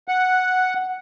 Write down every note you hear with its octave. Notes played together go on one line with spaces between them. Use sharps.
F#5